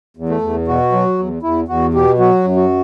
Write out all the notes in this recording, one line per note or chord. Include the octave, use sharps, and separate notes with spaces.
E2
A3
E2
B2 F#4
F#3
E2
E2 E4
E2 F#4
B2 G4
F#3 F#4
F#2
F#4